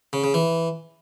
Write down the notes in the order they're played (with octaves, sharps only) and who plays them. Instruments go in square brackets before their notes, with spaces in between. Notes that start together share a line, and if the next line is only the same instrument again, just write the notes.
[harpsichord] C#3
C#3
E3